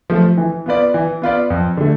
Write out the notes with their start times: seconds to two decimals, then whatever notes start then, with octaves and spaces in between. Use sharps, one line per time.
0.10 F3 A3
0.37 E3
0.66 B3 F4 B4 D5
0.94 E3
1.22 B3 F4 B4 D5
1.50 F2
1.77 D3 A3